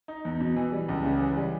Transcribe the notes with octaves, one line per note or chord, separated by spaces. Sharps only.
D#4
E2
B2
E3
G3
C#2
C#3
E3
G3